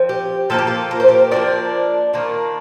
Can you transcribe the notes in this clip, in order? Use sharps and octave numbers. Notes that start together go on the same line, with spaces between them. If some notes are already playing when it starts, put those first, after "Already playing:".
Already playing: F3 C4
G4
F3 A#3 D#4 A4
G4
F4 A4
A#4
C5
G4 A#4
F3 A#3 D4 F4 A#4 D5
D#3 A#3 D4 F4